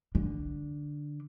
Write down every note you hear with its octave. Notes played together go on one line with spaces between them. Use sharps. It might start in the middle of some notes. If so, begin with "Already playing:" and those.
D3